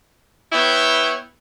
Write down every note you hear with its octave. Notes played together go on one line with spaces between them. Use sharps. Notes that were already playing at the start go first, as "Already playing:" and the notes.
B3 E4 C#5 G5